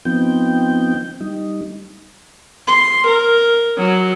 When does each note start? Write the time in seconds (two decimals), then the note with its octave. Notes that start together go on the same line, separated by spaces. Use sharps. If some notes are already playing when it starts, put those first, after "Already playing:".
0.05 F3 B3 C4 D#4 G5 G6
1.21 G3 D#4
2.67 C6
3.07 A#4
3.78 F#3